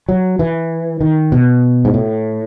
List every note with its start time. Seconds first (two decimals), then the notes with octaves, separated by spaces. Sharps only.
0.09 F#3
0.39 E3
1.01 D#3
1.32 B2
1.85 G#2
1.94 A2